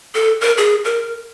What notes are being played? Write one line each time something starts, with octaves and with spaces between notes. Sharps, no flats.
A4
A#4
G#4
A#4